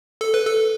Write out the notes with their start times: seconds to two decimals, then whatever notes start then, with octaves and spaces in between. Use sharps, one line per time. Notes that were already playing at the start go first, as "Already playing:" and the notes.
0.21 A4
0.34 B4
0.46 A4